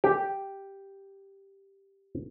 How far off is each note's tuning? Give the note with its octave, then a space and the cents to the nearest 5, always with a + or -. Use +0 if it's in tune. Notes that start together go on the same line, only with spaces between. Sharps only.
G4 +0